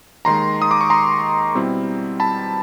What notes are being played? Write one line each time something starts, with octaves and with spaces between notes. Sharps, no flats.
D#2 D#3 G#3 A#5 C6
D#6
D6
C#6
A#5 C6
B2 G3 C4 E4
A5 B5